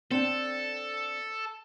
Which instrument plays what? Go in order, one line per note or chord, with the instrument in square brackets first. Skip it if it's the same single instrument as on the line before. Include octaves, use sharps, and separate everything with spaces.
[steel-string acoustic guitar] C4 D4 G5 [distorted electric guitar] A4